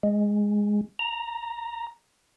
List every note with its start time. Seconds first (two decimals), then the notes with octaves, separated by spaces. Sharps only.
0.03 G#3
0.99 A#5